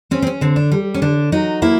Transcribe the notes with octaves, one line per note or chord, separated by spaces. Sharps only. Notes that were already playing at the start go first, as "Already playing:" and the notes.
C4 C#4
C4
C#4
D3 C4
D4
G3
C#4
D3 D4
F#3 D#4
A#3 E4